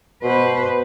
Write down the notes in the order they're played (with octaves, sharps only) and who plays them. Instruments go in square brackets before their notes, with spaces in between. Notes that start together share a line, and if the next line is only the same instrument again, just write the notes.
[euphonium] B2 [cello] B4 C5